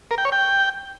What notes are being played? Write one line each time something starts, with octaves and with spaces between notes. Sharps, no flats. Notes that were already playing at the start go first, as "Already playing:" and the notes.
A#4
G5
C#5
G5